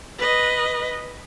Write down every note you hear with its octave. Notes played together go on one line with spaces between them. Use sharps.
B4 D#5